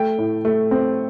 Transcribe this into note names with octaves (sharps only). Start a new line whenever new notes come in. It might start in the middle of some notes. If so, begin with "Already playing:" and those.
Already playing: A3 G5
A2
A3
C4